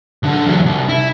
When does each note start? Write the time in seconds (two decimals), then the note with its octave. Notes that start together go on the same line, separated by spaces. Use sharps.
0.23 B1 D3
0.46 E2 F#3
0.66 C2
0.89 E4